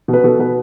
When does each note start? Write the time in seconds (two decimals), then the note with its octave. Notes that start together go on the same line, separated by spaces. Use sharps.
0.08 B2
0.13 B4
0.24 B2 A4
0.39 B2 B4